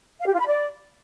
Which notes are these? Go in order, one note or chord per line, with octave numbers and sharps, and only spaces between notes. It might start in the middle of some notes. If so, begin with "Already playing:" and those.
F5
G4
F4
B5
D5